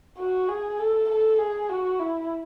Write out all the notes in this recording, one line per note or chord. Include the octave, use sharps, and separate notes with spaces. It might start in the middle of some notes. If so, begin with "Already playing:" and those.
F#4
G#4
A4
A4
G#4
F#4
E4